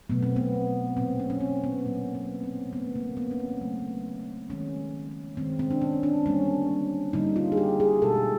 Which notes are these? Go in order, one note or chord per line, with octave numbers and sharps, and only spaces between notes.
B2 F#3 A3 B3
C4
B3
A#2 F#3 A#3 C4
C#4
C#4
C4
B3
A#2 F#3 A#3
B3
C4
C#3 F#3 A3 B3
A#3
B3
C#4
C4
C#3 F#3 A3
D#3 G#3 C#4
D#3 G#3 C4
C4
D4
C#4
D4
D3 G3 A#3 C#4
D3 G3 A#3 D#4
F4
G#4
G4
G#4
B2 G#3 A4